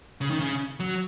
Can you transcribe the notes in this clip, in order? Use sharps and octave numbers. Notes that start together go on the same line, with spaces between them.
C#3
D#3
C#3
F#3